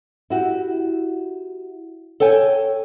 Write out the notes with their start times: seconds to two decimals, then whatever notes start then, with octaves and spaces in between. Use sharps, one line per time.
0.30 E4 F#4 G4
2.20 A4 C#5 G5 G#5